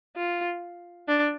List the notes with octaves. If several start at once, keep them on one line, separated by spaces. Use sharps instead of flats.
F4
D4